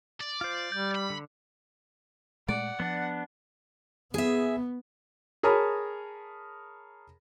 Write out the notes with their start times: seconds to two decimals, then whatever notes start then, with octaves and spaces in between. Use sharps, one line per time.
0.20 D5
0.41 F4 C5
0.72 G3 G6
0.95 B5
1.10 D3
2.48 A#2 G#3 A3 D5 F#5
2.80 F3 B3 D4
4.14 B3 G#4 E5
5.43 G#4 A#4 C#5 A5 B5 D#6